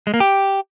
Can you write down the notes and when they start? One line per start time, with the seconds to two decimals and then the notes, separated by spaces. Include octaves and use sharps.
0.07 G#3
0.14 A#3
0.20 G4